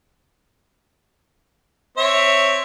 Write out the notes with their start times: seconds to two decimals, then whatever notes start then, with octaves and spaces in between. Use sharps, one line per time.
1.97 C4 C#5 E5